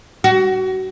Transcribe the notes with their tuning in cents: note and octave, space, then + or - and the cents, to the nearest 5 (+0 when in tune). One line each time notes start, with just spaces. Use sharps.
F#4 +25